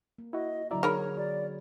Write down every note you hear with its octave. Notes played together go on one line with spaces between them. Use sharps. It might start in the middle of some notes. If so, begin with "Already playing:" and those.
A#3
E4 F#4 D#5
D3 F#3 E4 F#4 D5 E5 A#5
D#4 G#4 A#4 C#5 B5 F6
F#4 D5